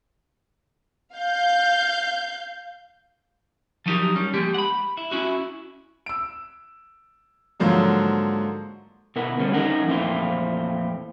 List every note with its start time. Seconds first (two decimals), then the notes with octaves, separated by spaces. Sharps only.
1.15 F5 G6
3.86 F3 F#3 B3 D#4 G4 A#4
4.16 G3 C#4
4.34 F3 G#3 A#3 G4
4.54 F#5 B5
4.97 E4
5.11 C#4 E4 F#4
6.06 E6 D7
7.60 G#2 D3 F3 F#3 A#3
9.16 B2 E4 A#4 B4 F#5
9.39 D3 G3 A3 C4 C#4
9.54 E3 C#4 D#4 A#4 F#5
9.87 F2 A#2 E3 A3 C4 F4